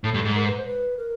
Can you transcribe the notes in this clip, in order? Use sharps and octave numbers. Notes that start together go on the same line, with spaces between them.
A2 A4
G2
G#2
A#4
B4
C5
B4
A#4